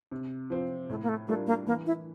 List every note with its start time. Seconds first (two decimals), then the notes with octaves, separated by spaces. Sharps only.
0.11 C3
0.50 F3 C4 F4
0.89 A2 A3
1.02 A#3
1.09 A3
1.28 G3 A3 D4 F4 A#4
1.47 A#3
1.67 E3 A#3
1.86 E4